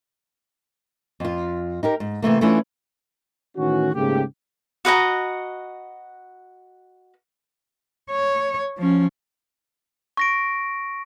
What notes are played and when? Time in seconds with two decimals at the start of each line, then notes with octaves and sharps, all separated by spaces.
1.20 F2 F4
1.83 D#4 G4 A#4
2.00 G#2
2.22 C3 E3 A3 A#3
2.41 E3 A3 C#4 D4 E4 F4
3.57 A2 D#3 E3 C#4 F#4
3.94 G#2 C#3 A3 A#3 G4
4.85 F#4 B4 D#5 A#5
8.11 C#5
8.77 F3 C#4
10.17 C#6 A#6 D7